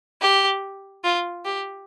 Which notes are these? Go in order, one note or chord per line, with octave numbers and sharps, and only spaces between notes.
G4
F4
G4